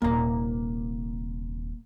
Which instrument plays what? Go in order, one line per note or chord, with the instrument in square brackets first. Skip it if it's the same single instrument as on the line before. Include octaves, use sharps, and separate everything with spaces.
[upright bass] D#1 C3 [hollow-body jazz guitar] A#3 A#5